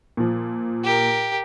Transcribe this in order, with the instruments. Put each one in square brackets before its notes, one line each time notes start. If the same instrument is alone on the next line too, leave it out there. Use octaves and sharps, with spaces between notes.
[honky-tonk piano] A#2 F3
[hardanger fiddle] G4 A#4